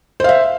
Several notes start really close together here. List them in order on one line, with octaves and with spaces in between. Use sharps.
C5 F5 E5